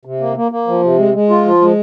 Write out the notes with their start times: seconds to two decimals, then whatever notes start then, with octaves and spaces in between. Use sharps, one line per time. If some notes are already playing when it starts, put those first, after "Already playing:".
0.05 C3
0.20 A#3
0.37 A#3
0.52 A#3
0.67 F3
0.83 C3
0.98 G#3
1.14 G#3
1.30 F4
1.45 F3
1.61 G#3